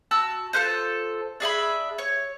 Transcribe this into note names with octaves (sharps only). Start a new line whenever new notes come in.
F#4 A5 E6
F4 A4 B4 C5
D4 G#4 E5 B5
C#5